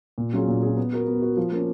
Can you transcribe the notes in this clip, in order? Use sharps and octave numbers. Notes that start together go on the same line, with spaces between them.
A#2
F#3 C#4 F4 G#4
A#2
F#3 C#4 F4 G#4
B3
F#4 A#4
B3
F#4 A#4
F3
A#3 C#4